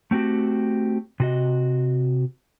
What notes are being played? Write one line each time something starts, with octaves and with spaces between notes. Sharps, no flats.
A3 C4 E4 F#4 G4
C3 F#4 D#5